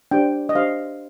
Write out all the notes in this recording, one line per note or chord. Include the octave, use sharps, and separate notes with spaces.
D4 G4 C5 G5
D#5
D4 G4 C5 F5